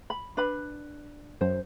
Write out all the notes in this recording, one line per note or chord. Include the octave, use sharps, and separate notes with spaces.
B5
D4 B4 B5
F#2 C5